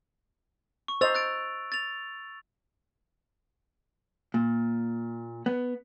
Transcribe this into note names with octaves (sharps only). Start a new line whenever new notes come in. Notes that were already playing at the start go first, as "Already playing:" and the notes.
C#6
C5 D#5 E6 A6 F7
F#6 A6 D7
A6 F7
A#2
B3